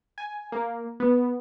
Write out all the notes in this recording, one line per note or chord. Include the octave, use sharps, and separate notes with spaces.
G#5
A#3
B3